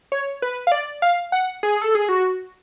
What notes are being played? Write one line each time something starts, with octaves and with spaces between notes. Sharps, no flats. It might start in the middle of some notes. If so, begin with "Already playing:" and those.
C#5
B4
F5
D5
F5
F#5
G#4
A4
G#4
F#4